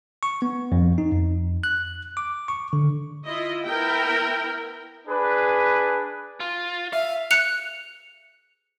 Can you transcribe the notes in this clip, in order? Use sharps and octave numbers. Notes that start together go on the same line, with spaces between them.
C#6
B3
F2
D#4
F2
F#6
D6
C#6
D3
E4 F4 D#5
B3 E4 A#4 G5
D4 G#4 B4
F4
E5 F5
F#6 C#7 F7